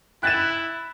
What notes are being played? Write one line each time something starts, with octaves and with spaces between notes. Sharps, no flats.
E4 F#6 A6 E7